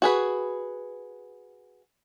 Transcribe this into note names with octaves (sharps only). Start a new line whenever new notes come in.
F#4 G#4 B4